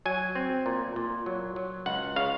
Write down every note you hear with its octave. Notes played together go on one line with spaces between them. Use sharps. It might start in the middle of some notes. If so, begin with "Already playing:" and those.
F#3 G#5
C4
A#2
A#2
F#3
F#3
C#2 F#5
C#3 F5